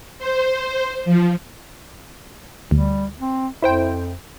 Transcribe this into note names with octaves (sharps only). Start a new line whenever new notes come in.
C5
F3
D2 G3
C4
F2 E4 C5 G5